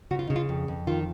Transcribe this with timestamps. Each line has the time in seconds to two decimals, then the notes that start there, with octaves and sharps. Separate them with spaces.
0.11 C#3 F#4
0.19 F4
0.27 C#3 D#4
0.36 F4
0.49 F2
0.68 F2
0.87 D#3 F4